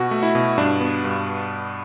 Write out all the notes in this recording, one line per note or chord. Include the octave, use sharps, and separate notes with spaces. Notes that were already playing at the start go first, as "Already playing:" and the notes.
Already playing: B2 F#4
A3
E4
B2
G2 D4
B3
G2